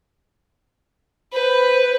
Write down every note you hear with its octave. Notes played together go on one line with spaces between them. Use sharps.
B4 C5